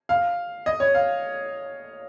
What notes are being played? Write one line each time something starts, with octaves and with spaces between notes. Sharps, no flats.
F5
D#5
C#5
F5